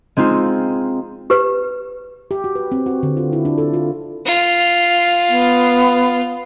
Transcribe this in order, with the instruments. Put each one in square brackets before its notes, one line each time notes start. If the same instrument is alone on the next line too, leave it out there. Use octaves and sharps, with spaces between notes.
[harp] G#3 C4 D#4 F4
[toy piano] G4 B4
[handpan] G4
F#4
B4
C4
F#4
D3
F4
E4
D4
A4
F4
[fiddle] F4
[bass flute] B3